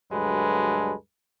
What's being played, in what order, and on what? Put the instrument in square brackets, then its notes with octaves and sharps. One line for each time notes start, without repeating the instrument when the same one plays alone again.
[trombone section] D2 G2 F#3 G#3 A4 B4